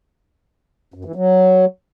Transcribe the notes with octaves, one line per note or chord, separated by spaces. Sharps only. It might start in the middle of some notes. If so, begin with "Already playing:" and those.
F#2
E3
F#3